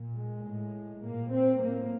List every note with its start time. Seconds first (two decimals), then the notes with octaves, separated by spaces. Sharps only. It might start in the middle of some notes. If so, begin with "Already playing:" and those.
Already playing: A#2
0.17 G#3
0.45 A2
1.03 A#2 A#3
1.31 C4
1.59 A2 A#3